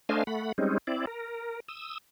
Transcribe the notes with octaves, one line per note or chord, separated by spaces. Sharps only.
A3 D4 C5 D#5 F5 G#5
A3 F#5 B5
G3 G#3 C4 C#4 D#4
C4 E4 D5
A#4
D#6 E6